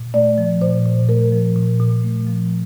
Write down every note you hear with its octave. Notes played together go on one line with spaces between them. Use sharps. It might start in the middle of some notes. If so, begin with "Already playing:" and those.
Already playing: A#2
A3 D5
F3
A#2 C5
A#2
A3 A#4
F3
A#2
A#2
A3
F3